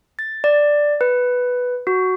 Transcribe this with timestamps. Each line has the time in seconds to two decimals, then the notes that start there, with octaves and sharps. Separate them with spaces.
0.19 A6
0.44 D5
1.01 B4
1.87 F#4